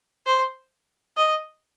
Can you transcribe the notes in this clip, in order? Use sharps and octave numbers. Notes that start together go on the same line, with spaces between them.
C5
D#5